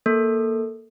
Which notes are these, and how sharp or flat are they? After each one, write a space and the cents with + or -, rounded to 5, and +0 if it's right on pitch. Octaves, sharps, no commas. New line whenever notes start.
A#3 +0 A4 +0